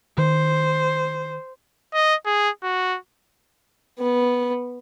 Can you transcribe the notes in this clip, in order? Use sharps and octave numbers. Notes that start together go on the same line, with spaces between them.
D#3 C5
D#5
G#4
F#4
B3